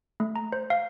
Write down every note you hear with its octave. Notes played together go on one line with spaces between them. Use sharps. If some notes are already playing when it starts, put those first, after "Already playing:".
A3
A#5
C5
F5